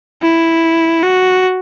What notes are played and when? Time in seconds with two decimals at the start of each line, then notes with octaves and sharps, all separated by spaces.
0.23 E4
1.03 F#4